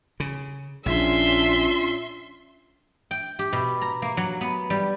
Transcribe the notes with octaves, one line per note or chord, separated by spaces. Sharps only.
C#3
A#1 C#4 D4 F4 E5 C6
G5
G4
B2
A#5
A#3
F#3
B3
G3